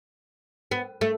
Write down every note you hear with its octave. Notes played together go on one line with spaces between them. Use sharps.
B3
A3